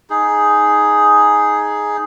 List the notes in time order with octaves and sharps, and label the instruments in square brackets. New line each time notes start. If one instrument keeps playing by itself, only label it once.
[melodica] D#4 G#4